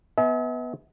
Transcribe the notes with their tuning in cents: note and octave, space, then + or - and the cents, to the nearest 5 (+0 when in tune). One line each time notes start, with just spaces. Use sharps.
B3 +0 E5 -45 G#5 +45